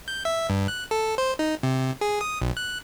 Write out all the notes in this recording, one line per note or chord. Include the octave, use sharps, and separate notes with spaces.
G6
E5
G2
F#6
A4
C5
D#4
C3
G#4
D#6
B1
F#6